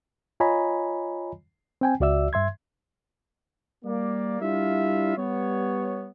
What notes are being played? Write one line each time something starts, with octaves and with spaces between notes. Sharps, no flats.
F4 C#5 D#5 G#5 A#5 B5
C4 G5 G#5
C#2 F#4 D5 E5 E6
G2 E5 C6 G#6
G3 A#3 D5
G3 D4 E4 F4 E5 F5
G3 B3 C#5